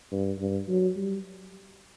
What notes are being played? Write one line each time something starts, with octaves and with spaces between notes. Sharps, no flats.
G2
G2
F#3
G3